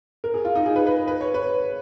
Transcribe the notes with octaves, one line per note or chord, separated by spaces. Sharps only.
A#4
G#4
F4
D#4
G#4
B4
B4
B4
C#5
B4